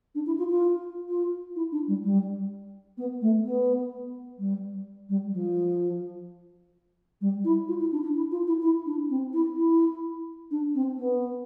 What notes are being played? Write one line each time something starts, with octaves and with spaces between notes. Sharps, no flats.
D4
E4
F4
F4
F4
E4
D4
G3
G3
B3
A3
B3
G3
G3
F3
G3
E4
F4
E4
D4
D4
E4
F4
E4
E4
D4
C4
E4
E4
D4
C4
B3